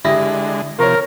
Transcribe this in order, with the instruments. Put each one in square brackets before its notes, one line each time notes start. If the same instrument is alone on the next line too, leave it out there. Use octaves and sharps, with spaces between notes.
[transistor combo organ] D3 G#3 [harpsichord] E4 [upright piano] G4 D#6 A#6
[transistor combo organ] C3 F3 [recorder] A#4 [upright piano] C#5 C#6